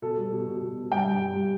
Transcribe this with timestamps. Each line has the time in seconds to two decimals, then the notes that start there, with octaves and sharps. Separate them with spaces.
0.02 B2 A4
0.17 G3
0.32 B2
0.47 B2
0.61 B2
0.77 B2
0.92 G2 G5
1.06 G2
1.21 G3
1.36 G3